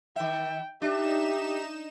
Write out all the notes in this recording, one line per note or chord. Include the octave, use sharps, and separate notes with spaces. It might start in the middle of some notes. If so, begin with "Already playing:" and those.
D#3 E5 G5
D4 D#4 G4 E5 E7